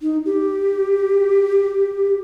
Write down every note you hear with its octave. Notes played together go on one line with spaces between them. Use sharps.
D#4
G4